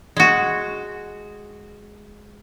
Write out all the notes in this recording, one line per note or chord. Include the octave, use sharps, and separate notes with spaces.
G#3 F#4